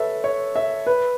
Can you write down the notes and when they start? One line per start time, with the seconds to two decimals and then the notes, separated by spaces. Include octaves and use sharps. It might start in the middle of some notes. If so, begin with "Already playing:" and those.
Already playing: A4 B4 C#5 E5
0.24 C#5
0.56 E5
0.86 B4